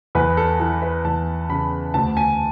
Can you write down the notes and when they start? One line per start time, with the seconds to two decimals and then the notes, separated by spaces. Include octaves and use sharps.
0.15 E2 B4
0.37 A4
0.60 E3 A4
0.82 B4
1.05 E2 A5
1.49 C#3 B5
1.94 D2 A5
2.17 G#5